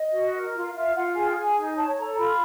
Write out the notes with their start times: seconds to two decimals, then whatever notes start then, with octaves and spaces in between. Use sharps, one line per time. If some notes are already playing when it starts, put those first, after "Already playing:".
Already playing: D#5
0.13 F#4
0.34 A#4
0.54 F4
0.75 F4 E5
0.95 F4 F#5
1.16 G#4 G#5
1.26 G5
1.36 G#4 G#5
1.57 D#4
1.76 C#5 A5
1.92 A5
1.97 A4 A#5
2.17 F4 B5